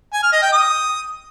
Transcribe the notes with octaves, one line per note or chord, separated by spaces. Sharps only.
G#5
F6
D#5
G5
D#6